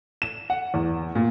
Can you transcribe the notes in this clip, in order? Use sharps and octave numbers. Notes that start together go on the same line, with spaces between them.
E7
F#5
E2
A#2